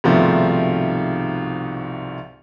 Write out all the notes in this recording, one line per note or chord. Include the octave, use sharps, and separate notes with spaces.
C2 G#2 B2 D#3 F3 A3